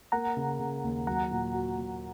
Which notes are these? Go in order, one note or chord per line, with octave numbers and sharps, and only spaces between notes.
A#3 F#5 A#5
C#3
C#3
D#2
F#3 F#5 A#5
A#2
F#4
A#2